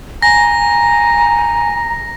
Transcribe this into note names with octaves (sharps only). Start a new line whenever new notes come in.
G#5 A#5 A#6